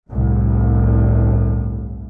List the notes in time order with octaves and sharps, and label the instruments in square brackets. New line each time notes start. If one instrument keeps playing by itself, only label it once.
[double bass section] G1 C2 A2